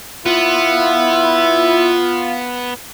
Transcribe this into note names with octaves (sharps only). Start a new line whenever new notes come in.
B3 E4 F4